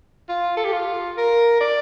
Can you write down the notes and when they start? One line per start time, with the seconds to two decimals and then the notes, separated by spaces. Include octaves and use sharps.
0.29 F4
0.57 A4
0.65 G4
0.73 F4
1.17 A#4
1.61 D5